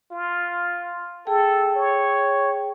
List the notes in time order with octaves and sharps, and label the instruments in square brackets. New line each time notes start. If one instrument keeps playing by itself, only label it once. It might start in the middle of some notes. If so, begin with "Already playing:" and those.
[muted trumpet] F4
[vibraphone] G#4 G5 [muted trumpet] A4
[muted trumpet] C#5